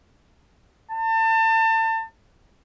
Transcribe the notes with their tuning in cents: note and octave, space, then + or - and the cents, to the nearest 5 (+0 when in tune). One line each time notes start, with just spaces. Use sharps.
A5 +30